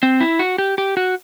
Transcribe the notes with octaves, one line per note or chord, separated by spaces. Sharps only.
C4
E4
F#4
G4
G4
F#4